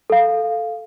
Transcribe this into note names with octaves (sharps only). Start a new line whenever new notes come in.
A4 F5